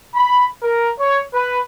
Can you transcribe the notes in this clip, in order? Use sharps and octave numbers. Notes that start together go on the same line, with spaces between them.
B5
A#4
C#5
B4